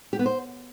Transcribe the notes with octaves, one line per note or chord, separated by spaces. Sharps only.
G4
B3
C5